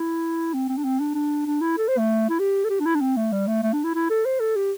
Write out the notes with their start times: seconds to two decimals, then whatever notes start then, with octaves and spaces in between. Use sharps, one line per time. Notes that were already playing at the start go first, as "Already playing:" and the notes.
Already playing: E4
0.54 C4
0.69 C4
0.77 D4
0.84 C4
1.00 D4
1.15 D4
1.46 D4
1.61 E4
1.78 A4
1.88 C5
1.98 A3
2.29 E4
2.39 G4
2.64 A4
2.70 G4
2.80 D4
2.85 E4
2.95 D4
3.01 C4
3.17 A3
3.32 G3
3.47 A3
3.63 A3
3.73 D4
3.84 E4
3.94 E4
4.10 A4
4.25 C5
4.40 A4
4.56 G4